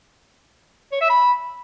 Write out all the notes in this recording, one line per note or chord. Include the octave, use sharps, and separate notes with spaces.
C#5
E5
B5